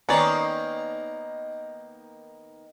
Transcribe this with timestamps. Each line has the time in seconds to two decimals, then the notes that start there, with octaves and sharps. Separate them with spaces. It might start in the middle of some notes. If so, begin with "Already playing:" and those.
0.09 D#3 A#3 B3 C#4 D5 A#5